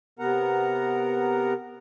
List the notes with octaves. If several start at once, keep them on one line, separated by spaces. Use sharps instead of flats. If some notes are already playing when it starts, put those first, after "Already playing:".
C3 B3 A#4 F#5 A#5